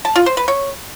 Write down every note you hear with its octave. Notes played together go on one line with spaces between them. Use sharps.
A5
F4
C5
B4
C#5